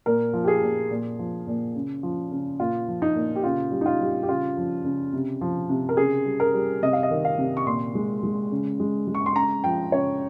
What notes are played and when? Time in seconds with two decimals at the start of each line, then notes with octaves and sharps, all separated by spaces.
0.06 A#2 A#4
0.33 F3
0.44 G4
0.48 G#4
0.63 A#2
0.90 A#2
1.19 F3
1.47 A#2
1.75 C#3
2.03 F3
2.32 C#3
2.60 A#2 F4
2.88 F3
3.02 D#4
3.15 A#2
3.36 G4
3.43 C#3 F4
3.72 G3
3.81 D#4
3.86 F4
4.01 G3
4.23 G4
4.28 C#3 F4
4.57 F3
4.84 C#3
5.13 C3
5.41 F3
5.69 C3
5.89 A#4
5.97 C#3 G#4
6.25 G3
6.40 A#4
6.54 G3
6.82 C3 D#5
6.93 F5
7.03 D#5
7.11 D#3
7.25 F5
7.38 C3
7.57 C#6
7.66 A#2 C6
7.95 G#3
8.23 G#3
8.51 C#3
8.80 G#3
9.08 G#3
9.15 C#6
9.26 C6
9.35 C#3 A#5
9.64 F3 G5
9.92 C#3 C#5